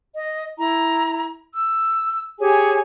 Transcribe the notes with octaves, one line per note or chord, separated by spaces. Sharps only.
D#5
E4 A#5
E6
G4 G#4 C#5 G#5